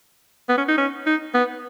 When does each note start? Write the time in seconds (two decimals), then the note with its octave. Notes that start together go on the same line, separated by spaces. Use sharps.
0.49 B3
0.58 C#4
0.68 D#4
0.78 C#4
1.07 D#4
1.34 B3